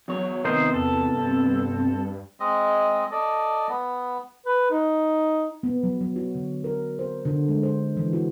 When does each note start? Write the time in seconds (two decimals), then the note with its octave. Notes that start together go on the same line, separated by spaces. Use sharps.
0.08 E2 F#3 C#5
0.45 C3 D#3 B3 D#4 A#4 C5
0.74 E2 A4
1.14 G2 C4
2.40 G#3 C4 D#5
3.12 A4 D5 D#5
3.69 B3
4.46 B4
4.71 D#4
5.63 B3
5.83 F#3
6.01 F#3
6.16 F#4
6.35 D3
6.64 A#4
6.99 C5
7.25 D3
7.49 G#3
7.63 C5
7.97 E3
8.13 F#4